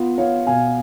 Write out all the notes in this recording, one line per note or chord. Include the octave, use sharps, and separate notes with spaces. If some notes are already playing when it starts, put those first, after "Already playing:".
Already playing: B3 F4
B3 C#5 F5
B2 F5 G#5